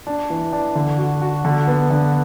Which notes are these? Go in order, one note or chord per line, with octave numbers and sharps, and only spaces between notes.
D4
E3
D4
D3
F#4
F#4
D3
B3
D3